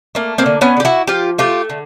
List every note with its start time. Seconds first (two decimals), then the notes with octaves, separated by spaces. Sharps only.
0.15 A3 A#3
0.38 A#3 C4
0.46 D3
0.61 B3 C#4
0.77 D3
0.80 G4
0.85 E4 F#4
1.07 F3 F4 G4
1.38 A3 F4 G4
1.70 D3